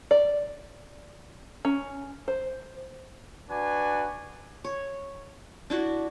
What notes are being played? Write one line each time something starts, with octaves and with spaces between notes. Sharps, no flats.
D5
C#4
C5
D4 F#4 B4 D5 G#5
C#5
D4 E4 F#4